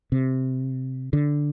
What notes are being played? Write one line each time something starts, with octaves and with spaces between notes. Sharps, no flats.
C3
D3